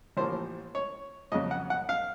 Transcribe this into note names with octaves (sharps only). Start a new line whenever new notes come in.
A1 A2 F3 A#3 C5
C#5
F2 C#3 F#3 D#5
F#5
F#5
F5